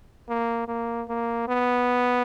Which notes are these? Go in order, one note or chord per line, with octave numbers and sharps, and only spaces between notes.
A#3
A#3
A#3
B3